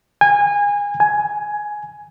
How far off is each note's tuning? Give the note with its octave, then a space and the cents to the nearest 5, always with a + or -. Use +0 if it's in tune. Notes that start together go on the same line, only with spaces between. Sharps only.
G#5 -25
G#5 +10